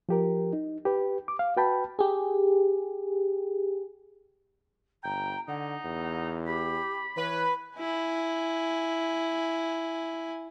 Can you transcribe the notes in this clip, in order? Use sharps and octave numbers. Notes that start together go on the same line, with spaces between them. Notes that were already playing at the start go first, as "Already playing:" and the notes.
F3 G4 A#4
D#4
G4 B4
D6
F5
F#4 B4 G5 A5 B5
G4 G#4
G1 G5 A#5
D3 D#4 F#5
E2
G4 B5
E3 B4 C#5
E4 G#5